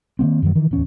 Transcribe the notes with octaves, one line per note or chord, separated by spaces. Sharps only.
D#3 F#3 A#3 C4
F#2 D3 D#3 F#3
D#3 E3
D1 E2 C#4